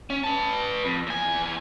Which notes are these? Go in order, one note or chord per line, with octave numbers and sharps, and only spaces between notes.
C#4
B4 A5
F2
E2 G#5